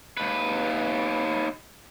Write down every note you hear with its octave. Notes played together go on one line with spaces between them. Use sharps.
D#2 B4